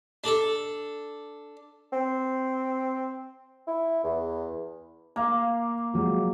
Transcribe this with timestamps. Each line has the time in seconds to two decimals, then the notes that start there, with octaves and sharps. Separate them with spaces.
0.24 D4 A4
1.92 C4
3.67 E4
4.03 E2
5.16 A#3 F5 A#5
5.94 F3 F#3 G#3